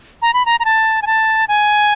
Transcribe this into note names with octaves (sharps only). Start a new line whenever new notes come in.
A#5
B5
A#5
A#5
A5
G#5
A5
G#5